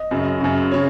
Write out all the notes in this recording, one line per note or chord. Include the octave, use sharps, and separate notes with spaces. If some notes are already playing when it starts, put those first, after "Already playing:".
Already playing: D#5
F#2 C#3
F#2 C#3
C#3 C#5